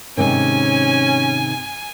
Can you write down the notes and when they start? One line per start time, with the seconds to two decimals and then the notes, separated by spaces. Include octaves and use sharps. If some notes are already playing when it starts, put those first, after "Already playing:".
0.17 G#2 C3 D#3 C#4 G#5